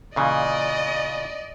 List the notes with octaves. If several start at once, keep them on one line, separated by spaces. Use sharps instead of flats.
A#2 C#3 E3 D5 D#5